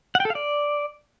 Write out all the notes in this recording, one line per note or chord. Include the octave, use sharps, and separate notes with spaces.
F#5
G5
A4
F5
D5